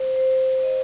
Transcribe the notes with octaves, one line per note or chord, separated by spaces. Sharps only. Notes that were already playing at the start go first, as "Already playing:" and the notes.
Already playing: C5
C5
D#5